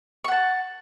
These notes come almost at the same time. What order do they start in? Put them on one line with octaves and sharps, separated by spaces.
C#6 F#5 A5